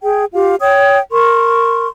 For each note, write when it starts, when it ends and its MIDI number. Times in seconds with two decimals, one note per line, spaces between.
0.03 0.24 68
0.03 0.24 79
0.33 0.55 65
0.33 0.55 67
0.33 0.55 77
0.59 0.98 73
0.59 0.98 79
0.59 0.98 87
1.12 1.86 70
1.12 1.86 84
1.12 1.86 85